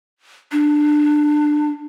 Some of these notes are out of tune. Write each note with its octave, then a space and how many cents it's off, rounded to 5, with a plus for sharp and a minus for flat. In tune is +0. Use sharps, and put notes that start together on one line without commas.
D4 +20